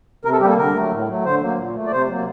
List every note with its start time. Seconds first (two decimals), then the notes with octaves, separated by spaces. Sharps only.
0.25 C3 A#4
0.33 A4
0.41 G3 G4
0.45 A#3 A4
0.57 D3 A#4
0.74 F#3 A3
0.92 A2
1.09 F#3 A3
1.25 D3 C5
1.41 F#3 A#3
1.59 A#2
1.75 A3
1.86 D5
1.92 C3 C5
2.09 F#3 A#3